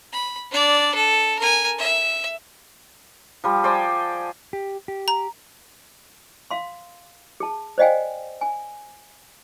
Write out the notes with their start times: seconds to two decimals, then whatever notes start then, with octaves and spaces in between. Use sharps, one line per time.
0.13 B5
0.51 D4 D5
0.95 A4
1.39 A#4 G#5
1.78 E5
3.44 F3 G3
3.64 C5 D5 G5 G#5
4.53 G4
4.88 G4
5.08 A#5
6.51 F5 C6
7.40 G#4 A5
7.78 C5 D5 D#5 F5 G5 G#5
8.41 G#5